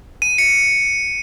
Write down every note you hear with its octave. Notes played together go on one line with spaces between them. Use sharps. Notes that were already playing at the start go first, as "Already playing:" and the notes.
D#7
C#7